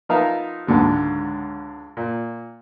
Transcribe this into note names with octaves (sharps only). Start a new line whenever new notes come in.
F3 B3 D#4 A#4 E5 F5
C#2 G#2 D3 F#3
A#2